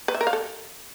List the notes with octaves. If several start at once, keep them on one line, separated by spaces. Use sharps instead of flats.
B4
E5
A#4
F5
A4